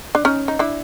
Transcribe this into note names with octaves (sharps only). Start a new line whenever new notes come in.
D4
C#4 D#4
D#4
D4 E4